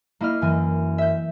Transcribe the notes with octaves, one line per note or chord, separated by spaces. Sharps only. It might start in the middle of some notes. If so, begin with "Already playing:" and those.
A#3 E4 D#5 F6
F#2 E3 G#5
E5 G6